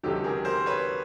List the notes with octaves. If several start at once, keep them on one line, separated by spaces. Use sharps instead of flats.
C#2 C3 D#3 F#3 G4 A4
G#4 A#4
A#4 C5
B4 C#5